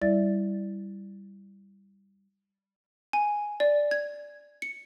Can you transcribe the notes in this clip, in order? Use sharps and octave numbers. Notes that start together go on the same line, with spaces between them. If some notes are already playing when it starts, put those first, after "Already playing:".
G3 E4 D5 E5 A6
G#5
D5
G#6
C#7